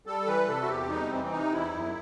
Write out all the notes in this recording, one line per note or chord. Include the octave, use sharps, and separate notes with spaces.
G3 A4
E3 B4
C3 A4
F#4
E2 G4
C4
G3 D#4
E3 C4
C4
C3 D#4
E2 E4
F#2